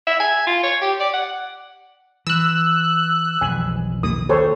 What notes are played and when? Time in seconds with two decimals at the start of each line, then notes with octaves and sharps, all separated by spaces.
0.07 E5
0.20 G#5
0.47 F4
0.63 C#5
0.82 G4
1.00 D5
1.13 F#5
2.27 E3 E6 F#6
3.41 B1 F2 E3 G#5
4.03 D#2 D#6
4.29 A4 C5 C#5